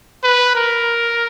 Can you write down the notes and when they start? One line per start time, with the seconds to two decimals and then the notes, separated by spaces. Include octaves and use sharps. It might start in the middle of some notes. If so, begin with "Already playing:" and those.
0.24 B4
0.55 A#4